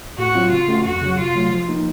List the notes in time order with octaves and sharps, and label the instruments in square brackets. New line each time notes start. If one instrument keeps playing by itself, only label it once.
[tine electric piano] A2 [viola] F#4
[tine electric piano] F#3 C4 F4
[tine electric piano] C#3 [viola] F4
[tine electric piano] A3 C#4 F#4
[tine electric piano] F2 [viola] F#4
[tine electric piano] C#3 F#3
[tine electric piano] C3 [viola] F4
[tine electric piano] F#3 A3
F3
A#3 D#4